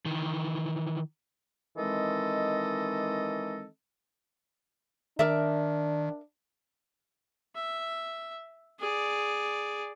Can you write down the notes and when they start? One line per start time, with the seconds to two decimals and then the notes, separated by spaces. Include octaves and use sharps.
0.05 D#3 E3
1.77 D#3 E3 G#3 C4 A4 D#5
5.19 D#3 D4 A#4 D5 E5
7.55 E5
8.79 G#4 D5